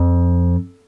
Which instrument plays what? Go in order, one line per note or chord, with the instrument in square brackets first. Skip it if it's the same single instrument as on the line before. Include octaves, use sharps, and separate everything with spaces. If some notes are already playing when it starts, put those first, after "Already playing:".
Already playing: [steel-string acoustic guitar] F2